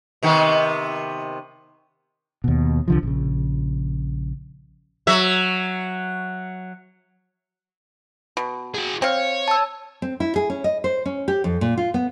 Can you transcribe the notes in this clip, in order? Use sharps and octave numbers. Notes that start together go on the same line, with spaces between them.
C3 D#3 B3
D#2 B2
C2 D3 F3
A#1 C#3
F#3 E5
B2
F#4 G#4
C4 C#5 F5
A5 E6
C4
E4
G#4
C#4
D#5
C5
C#4
G4
F2
A#2
F4
B3